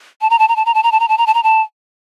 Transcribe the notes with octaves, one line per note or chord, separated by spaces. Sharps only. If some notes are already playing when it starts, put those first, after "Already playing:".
A5
A#5
A5
A#5
A5
A#5
A5
A#5
A5
A#5
A5
A#5
A5
A#5
A5